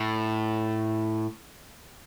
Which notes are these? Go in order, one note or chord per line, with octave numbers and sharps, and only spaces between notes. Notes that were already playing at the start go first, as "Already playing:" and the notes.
Already playing: A2